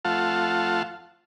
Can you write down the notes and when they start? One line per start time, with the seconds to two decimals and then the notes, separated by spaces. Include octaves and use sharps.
0.05 F2 A3 F4 F5 F#5 A5